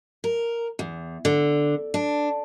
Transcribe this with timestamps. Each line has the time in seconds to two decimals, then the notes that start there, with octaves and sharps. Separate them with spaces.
0.24 A#4
0.79 E2
1.25 D3
1.94 D4